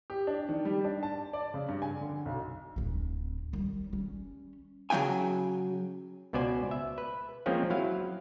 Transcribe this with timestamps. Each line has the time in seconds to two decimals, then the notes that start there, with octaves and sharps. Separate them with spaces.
0.10 G4
0.27 D4
0.49 D#3
0.65 G3
0.84 D4
1.03 A5
1.33 D5
1.54 C#3
1.68 G2
1.82 G#5
2.01 D3
2.25 B1
2.76 D1 C4
3.53 D#3 G3
3.93 G3 C#4
4.90 C#3 F#3 D#4 G5 G#5
6.33 C#2 B2 B3 C5 D5 G#5
6.71 E5
6.98 B4
7.46 F3 G#3 A#3 C4 C#4 F4
7.70 F#3 E4 F5